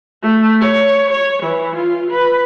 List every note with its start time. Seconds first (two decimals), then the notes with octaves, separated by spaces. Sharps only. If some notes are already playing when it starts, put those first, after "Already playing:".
0.22 A3
0.61 C#5
1.10 C#5
1.43 E3
1.76 F4
2.10 B4